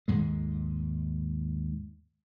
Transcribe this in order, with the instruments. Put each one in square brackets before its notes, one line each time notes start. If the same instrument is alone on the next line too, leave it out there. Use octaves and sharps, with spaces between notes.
[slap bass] D#2 G#2 G#3